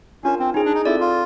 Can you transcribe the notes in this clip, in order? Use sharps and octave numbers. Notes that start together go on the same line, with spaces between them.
C#4 D4 F4 A#4
C4
C#4 D#4 G#4 C5
D4
D#4
C4 E4 F4 A4 D5
F4